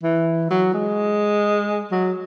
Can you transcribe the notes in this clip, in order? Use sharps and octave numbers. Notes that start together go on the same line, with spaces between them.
E3
F#3
G#3
F#3